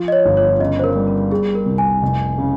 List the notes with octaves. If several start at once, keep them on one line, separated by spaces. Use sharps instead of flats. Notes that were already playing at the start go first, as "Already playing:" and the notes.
Already playing: F3
D#5
C#5
G1
C#5
C#3 D#5
C5
A#4
G3
A#4
G3 G#4
A#4
C2
G#5
F1
C#3